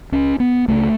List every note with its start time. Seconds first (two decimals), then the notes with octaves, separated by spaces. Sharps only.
0.12 C#2 C#3 C#4
0.40 B3
0.68 C#2 C#3 A3